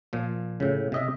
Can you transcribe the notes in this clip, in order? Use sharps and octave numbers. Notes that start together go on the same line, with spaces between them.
A#2 F3
A2 C#3
C3 D#5 E5